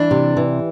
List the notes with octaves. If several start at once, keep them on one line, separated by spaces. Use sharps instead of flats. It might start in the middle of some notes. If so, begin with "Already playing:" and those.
Already playing: E3 D4
C3
E3